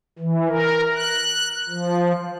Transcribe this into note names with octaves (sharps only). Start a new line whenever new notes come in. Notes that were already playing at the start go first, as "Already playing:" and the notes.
E3
A#4
F#6
F3